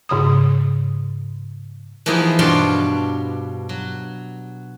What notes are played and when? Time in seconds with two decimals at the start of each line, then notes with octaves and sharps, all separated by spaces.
0.09 G#2 C#3 B5 D#6
2.06 E3 F3 A#3 B3 D#4 G#4
2.39 G2 B2 D4 F4 F#5 C6
3.69 F#3